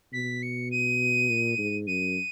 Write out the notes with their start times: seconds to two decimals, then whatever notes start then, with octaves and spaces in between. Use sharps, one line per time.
0.13 B2 B6
0.43 C#7
0.71 D#7
1.29 A#2
1.58 G#2
1.87 F#2 D#7